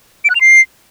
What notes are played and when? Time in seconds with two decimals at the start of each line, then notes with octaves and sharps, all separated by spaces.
0.25 D7
0.30 F#6
0.35 F7
0.41 C7